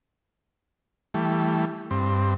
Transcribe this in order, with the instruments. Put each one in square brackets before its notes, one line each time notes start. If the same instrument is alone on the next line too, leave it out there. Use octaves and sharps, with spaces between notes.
[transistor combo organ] E3 G3 A3
G2 C4